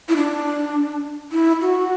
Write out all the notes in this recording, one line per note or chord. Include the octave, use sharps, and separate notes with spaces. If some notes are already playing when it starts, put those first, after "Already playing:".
E4
D4
E4
F#4